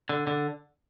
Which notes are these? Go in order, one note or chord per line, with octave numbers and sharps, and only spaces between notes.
D3
D3